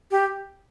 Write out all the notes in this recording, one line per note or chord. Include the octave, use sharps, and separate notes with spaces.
G4